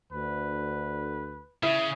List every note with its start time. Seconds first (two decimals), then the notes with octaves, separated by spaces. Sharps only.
0.12 D2 B4
1.63 C#3 E4